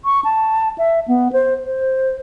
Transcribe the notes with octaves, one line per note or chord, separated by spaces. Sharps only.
C#6
A5
E5
B3
C5
C5